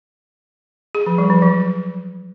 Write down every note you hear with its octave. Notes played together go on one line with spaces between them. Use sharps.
G#4
F3
G3
F3
F#3